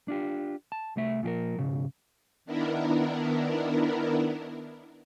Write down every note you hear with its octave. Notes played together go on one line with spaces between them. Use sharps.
D4 F4 G4
A5
C2 A3 E5
A#2 F3 G4 A#4
B1 G#2 C#3
D#3 B3 D4 E4 A#4